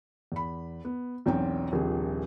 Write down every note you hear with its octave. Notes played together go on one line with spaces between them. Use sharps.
E2 B5
B3
B1 E2 C4 C#4 C#5 G5
D#1 A#1 C3 G#4